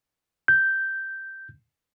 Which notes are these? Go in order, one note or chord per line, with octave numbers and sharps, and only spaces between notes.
G6